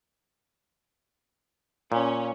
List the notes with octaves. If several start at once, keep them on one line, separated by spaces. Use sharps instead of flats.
A#2 C#4